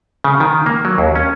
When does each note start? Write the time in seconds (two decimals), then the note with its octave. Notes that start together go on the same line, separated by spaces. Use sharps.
0.24 C#3
0.40 D#3
0.66 A#3
0.85 F#3
0.98 D#2
1.15 C#4